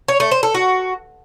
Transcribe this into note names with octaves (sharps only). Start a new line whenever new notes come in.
C#5
A3
C5
A4
F#4